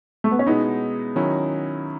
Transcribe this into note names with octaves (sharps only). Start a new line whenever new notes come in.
A3
B3
C#4
B2 G#3 B3 D#4 E4
D#3 F#3 C#4 E4